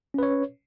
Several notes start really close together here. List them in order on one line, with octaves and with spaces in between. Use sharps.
C#4 B4 C#5